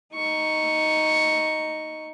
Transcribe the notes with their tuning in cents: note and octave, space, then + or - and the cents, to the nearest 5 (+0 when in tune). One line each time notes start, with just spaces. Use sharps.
D#4 +0 C#6 +0